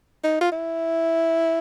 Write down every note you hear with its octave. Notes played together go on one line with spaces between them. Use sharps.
D#4
F4
E4